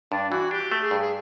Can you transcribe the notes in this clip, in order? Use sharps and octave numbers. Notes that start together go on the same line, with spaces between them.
G2 D4
E3 F#4
D4 G4
A3
G#4
G2
G#4